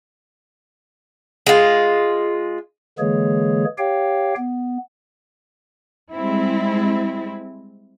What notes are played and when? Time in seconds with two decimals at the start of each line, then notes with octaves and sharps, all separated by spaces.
1.47 G#3 F4
2.99 D3 E3 G#3 A#3 G#4 C#5
3.78 G4 C#5 F5 G5
4.37 B3
6.13 G3 G#3 C4 E4